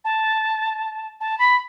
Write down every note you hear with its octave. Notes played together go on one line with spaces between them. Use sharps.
A5
A5
B5